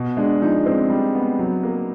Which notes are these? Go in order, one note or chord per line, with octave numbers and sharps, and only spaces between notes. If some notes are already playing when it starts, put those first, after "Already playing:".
Already playing: B2
G#3 D4
F3 D#4
G#3 C4
G3
B3
F#3
A#3